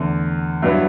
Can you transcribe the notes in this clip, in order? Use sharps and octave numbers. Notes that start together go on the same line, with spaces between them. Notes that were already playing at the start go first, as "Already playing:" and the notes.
Already playing: E2 D3 A3
G2 F#3 B3 E4